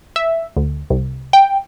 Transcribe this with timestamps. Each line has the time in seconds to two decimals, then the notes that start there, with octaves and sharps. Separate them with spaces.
0.16 E5
0.57 D2
0.90 C2
1.33 G5